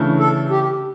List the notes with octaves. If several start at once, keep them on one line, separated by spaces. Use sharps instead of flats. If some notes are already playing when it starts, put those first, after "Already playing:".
Already playing: C#3 E3 A3 D4
A4
G4